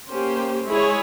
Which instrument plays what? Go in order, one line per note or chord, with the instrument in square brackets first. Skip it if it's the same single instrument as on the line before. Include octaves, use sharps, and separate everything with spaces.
[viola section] A#3 C#4 G4 C5
G#3 E4 G#4 C#5